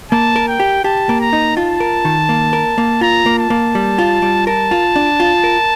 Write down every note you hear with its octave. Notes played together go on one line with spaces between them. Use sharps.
A#3 A5
A#4
G5
G4
G4 A5
A#3
A#5
D#4
F4 A5
A#4
D#3
A#3
A#4
A#3
F4 A#5
A#3
A5
A#3
G3
F4
G3
A#4 A5
F4
D4
F4
A#4